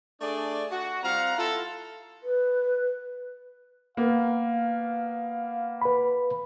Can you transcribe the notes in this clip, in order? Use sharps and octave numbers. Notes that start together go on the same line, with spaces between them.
A3 D4 G#4 D5
F#4
G3 C4 F4 F5 F#5 A#5
E4 F4 A4
B4
A#3 B3 F5
B4 B5